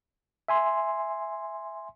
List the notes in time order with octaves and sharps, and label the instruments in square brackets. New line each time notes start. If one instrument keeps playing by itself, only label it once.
[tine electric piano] E5 G#5 C6